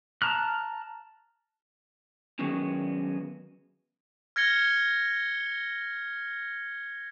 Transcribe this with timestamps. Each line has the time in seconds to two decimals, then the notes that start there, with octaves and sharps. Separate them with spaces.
0.22 A5 A#5 F6 F#6
2.39 D#3 F#3 G#3 B3 C#4
4.36 F6 G#6 A#6 C#7 G7